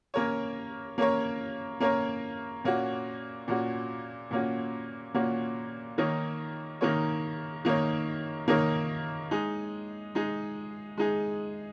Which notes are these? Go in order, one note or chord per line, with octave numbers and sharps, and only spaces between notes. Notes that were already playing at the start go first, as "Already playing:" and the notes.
A#3 C#4 A#4 C#5
A#3 C#4 A#4 C#5
A#3 C#4 A#4 C#5
A#2 A#3 C#4 F#4
A#2 A#3 C#4 F#4
A#2 A#3 C#4 F#4
A#2 A#3 C#4 F#4
D#3 A#3 D#4 A#4 C#5
D#3 A#3 D#4 A#4 C#5
D#3 A#3 D#4 A#4 C#5
D#3 A#3 D#4 A#4 C#5
G#3 D#4 G#4
G#3 D#4 G#4
G#3 D#4 G#4